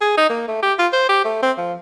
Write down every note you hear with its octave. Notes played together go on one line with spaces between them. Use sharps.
G#4
D#4
A#3
A3
G4
F4
C5
G4
A3
C4
F3